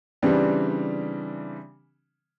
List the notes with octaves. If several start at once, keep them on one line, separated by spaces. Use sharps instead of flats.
C#3 E3 G3 C4 D4